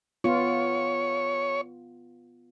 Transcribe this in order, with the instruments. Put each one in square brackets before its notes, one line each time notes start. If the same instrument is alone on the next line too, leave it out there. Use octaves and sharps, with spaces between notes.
[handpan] B3 F4 [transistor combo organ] C#5